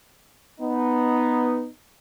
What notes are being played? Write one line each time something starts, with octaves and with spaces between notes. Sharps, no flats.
B3 D#4